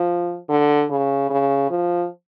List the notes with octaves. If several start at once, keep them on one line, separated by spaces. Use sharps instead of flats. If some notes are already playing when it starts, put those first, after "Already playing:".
Already playing: F3
D3
C#3
C#3
F3